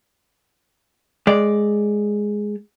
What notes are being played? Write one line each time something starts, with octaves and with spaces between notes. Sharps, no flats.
G#3 D5